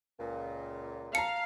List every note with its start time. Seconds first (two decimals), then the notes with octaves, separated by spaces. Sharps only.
0.20 C#2 A#2
1.15 F5 A5 A#5 C#7